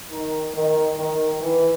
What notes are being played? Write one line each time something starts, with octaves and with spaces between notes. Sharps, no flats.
D#3
D#3
D#3
E3